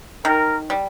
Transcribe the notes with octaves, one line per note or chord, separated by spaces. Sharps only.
D#3 A#4
G3